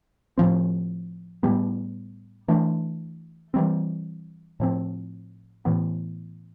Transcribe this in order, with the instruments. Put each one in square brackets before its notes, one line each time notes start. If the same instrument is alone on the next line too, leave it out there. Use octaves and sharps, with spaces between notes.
[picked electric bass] A2 F3 C4
A2 G3 B3
E3 A3 D4
E3 G3 C4
A2 F3 C4
A2 E3 B3